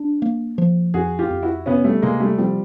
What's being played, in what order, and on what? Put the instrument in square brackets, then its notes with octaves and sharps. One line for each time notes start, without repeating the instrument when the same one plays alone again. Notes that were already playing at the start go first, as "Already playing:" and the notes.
Already playing: [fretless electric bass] D4
A#3
F3
[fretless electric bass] F2 [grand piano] F#4 G#4
[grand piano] F4 G4
[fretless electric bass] F2
[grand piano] E4 F#4
[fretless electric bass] C3 [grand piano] B3 C#4
[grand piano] G3 A3
[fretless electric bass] C3 [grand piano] G#3 A#3
[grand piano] G3 A3
[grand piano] F3 G3 [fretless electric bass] C4